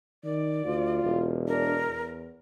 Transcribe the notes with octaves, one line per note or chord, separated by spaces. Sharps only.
D#3 D5
D2 F4
E1
D4 A#4
E2